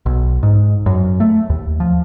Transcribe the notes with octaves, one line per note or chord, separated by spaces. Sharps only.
B1
G#2
F#2
A3
D#2
F3